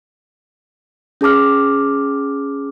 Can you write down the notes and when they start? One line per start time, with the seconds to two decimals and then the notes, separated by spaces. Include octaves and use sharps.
1.21 C#4 G#4 A5 D6 F6